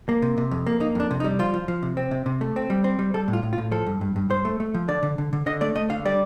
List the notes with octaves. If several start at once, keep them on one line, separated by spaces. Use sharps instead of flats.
A#3
C3
C3
F2
A#3
A#3 D#4
F2 D4
C3
D#4
G3
F3 F4
F3
F3
C3
C4
C3
C3
A3
C4
G3
C4
G3
G3 A4
A2
F4
A2
F4
A2
F3 A4
G2
G2
G2
G2 C5
A3
A3
F3
D3 D5
D3
D3
D3
D3 D#5
A3 D5
A3 D#5
D3 F5
G3 D5